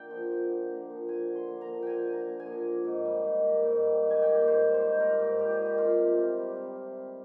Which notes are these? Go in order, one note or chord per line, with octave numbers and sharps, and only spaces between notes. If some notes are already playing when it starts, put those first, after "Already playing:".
Already playing: D3 A#3 G5
F3
D3
D3
A#3
F3
D3 G#5
D3
C6
A#3
A#5
F3
D3 G5 G#5
D3 G#5
A#5
A#3
G#5
F3
A#3
G#2
G3
D#3
A#3
G#2
G3
D#3
G#5
A#3 G5
G#2
C5
G3
C5
D#3
A#3 A#4
G#2
G3 G4
G#4
D#3
G4
C3 F4
C3
C4
G3
C3
C3
C4